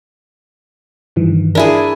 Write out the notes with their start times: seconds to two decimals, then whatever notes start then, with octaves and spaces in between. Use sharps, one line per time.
1.16 G2 D#3 E3
1.55 D4 E4 G#4 A#4 G#5